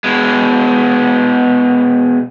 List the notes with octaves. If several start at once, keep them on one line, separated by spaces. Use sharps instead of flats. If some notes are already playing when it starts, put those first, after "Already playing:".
B2 G#3